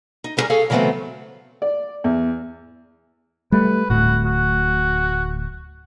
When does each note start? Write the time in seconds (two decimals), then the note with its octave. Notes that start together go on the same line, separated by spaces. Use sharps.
0.24 D#4
0.37 G3 B3 C#4 G#4 A#4
0.50 G#4 A4 C#5 F5
0.70 C#3 E3 F#3 A3 B3 C4
1.62 D5
2.04 E2
3.52 G3 A3 B4
3.90 D1 A2 F#4
4.25 F#4